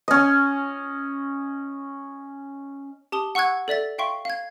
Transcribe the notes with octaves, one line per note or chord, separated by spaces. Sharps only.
C#4 D#5
G4 A5 D#6 G7
F#5 C#6 E6 F#6 G#6
A4 D5 E5 A6
E5 F5 G5 C6 C#6
F5 G#6